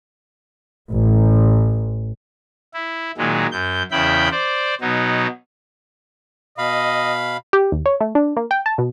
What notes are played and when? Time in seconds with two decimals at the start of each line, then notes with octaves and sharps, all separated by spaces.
0.92 A1
2.74 E4
3.18 A#2 D#3 F#3 G#3
3.51 F#2 G6
3.91 E2 C#3 E4 G5 B5 G6
4.31 C5 D5
4.81 B2 F#3 D#4
6.58 B2 D#5 F5 B5
7.53 G4
7.72 D#2
7.86 C#5
8.01 A3
8.15 D4
8.37 A#3
8.51 G5
8.66 A5
8.78 B2